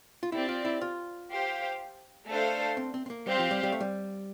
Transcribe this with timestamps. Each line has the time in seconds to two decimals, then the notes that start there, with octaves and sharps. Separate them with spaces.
0.23 F4
0.32 C4 E4 G4 D5
0.49 F4
0.65 E4
0.81 F4
1.31 G4 C5 F5
2.28 A3 D4 A4 C5 F5
2.77 C4
2.94 C4
3.06 C4
3.10 A#3
3.26 G3 C4 G4 C5 F5
3.39 F3
3.51 G3
3.63 G3
3.72 A3
3.80 G3